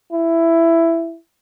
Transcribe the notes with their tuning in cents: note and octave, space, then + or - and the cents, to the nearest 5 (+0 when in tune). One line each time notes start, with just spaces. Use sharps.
E4 +10